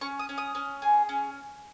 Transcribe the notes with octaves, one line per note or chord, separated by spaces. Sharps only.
C#4 C#6
D#6
C#4
D#6
C#4
G#4
C#4